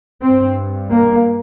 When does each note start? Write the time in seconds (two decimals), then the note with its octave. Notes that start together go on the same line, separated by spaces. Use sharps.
0.23 G2 C4
0.91 A#3